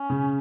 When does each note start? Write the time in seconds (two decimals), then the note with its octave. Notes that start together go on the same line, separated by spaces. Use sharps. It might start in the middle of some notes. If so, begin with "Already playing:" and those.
Already playing: C#4
0.10 C#3